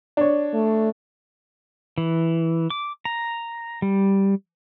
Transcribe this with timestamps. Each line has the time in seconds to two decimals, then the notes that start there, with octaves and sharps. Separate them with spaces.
0.17 D4 C#5
0.54 A3
1.98 E3
2.70 D6
3.05 A#5
3.82 G3